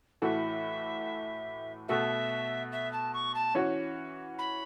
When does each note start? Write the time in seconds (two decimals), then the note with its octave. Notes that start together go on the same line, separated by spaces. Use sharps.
0.22 A2 E3 A3 F#4 A4 E5
1.88 B2 A3 F#4 A4 E5
2.72 E5
2.92 A5
3.13 C#6
3.35 A5
3.55 E3 C#4 F#4 C#5
4.38 B5